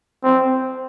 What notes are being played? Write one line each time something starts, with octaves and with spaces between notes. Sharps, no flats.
C4